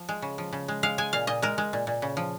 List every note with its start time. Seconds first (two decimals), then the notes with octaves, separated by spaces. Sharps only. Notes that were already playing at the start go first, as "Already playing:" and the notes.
Already playing: F3
0.09 G#3
0.22 C#3
0.38 F3
0.53 C#3
0.68 G#3
0.83 G#3 F5
0.98 G#3 G#5
1.13 A#2 F5
1.27 A#2 D#5
1.42 G#3 A#4
1.58 G#3
1.73 A#2
1.87 A#2
2.02 C#3
2.17 F3